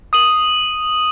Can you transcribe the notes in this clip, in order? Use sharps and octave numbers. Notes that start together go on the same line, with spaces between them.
D#6 D#7 F#7